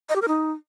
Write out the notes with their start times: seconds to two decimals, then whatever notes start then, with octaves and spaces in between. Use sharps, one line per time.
0.09 D#5
0.15 G4
0.22 A#4
0.28 D#4